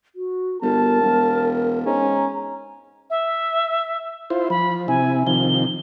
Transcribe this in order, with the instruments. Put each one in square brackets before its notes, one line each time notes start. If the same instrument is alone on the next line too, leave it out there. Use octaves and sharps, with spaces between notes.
[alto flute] F#4
[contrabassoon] G1 [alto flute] A#4 [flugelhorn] A5
[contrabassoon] E1
[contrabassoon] G#2 [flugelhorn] C#4 [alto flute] A#5
[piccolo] E5
[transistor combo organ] E4 F4 C5
[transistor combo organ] F3 [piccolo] B5
[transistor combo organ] C3 E4 [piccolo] G#5
[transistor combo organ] C3 D#3 F3 [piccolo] G7